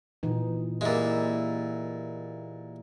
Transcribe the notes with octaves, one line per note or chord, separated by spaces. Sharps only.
A#2 E3 D#4
A#2 G#3 E4 G4 E5